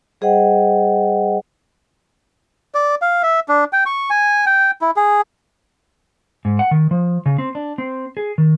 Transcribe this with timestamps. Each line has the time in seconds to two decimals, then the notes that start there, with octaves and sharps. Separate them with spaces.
0.21 G3 G#4 C5 D#5 F#5 G5
2.75 D5
3.02 F5
3.23 E5
3.49 D4
3.73 G5
3.86 C#6
4.10 G#5
4.46 G5
4.82 E4
4.96 G#4
6.45 G#2
6.59 F#5
6.71 D#3
6.91 F3
7.26 C#3
7.38 C4
7.55 D4
7.78 C4
8.17 G#4
8.38 D#3